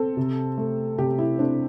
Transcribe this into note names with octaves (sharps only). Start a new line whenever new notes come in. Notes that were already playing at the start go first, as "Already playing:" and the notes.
Already playing: C4 A4
C3
A3
C3 G4
E4
C4 D4